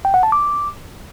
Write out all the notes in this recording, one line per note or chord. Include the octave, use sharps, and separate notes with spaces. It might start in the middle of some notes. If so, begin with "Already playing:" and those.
G5
F#5
A5
D6